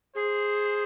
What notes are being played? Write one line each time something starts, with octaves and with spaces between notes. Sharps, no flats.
G#4 C5